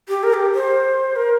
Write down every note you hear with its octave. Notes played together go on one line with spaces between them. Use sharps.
G4
A#4
G4
C5
A#4